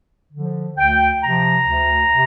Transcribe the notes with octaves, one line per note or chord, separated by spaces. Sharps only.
D3 F3
D2 G5
C3 F3 A#5
D2
C3